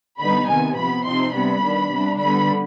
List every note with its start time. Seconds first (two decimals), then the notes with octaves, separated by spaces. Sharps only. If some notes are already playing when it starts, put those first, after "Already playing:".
0.20 D3 G3 B3 D#4 B5
0.49 C3 D#3 B3 G#5
0.78 C3 F3 B3 B5
1.06 C3 F3 C4 D#4 C6
1.35 C3 G3 B3 D4 B5
1.64 D#3 G3 B3 D4
1.92 C3 G3 D4
2.21 D3 G3 B3 B5